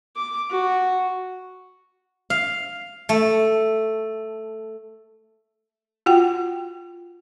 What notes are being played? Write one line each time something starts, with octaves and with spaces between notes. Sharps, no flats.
D6
F#4
F5
A3
F4 F#4 F#5 G5